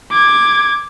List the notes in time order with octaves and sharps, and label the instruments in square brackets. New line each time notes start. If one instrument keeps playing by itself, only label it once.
[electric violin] D6 G#6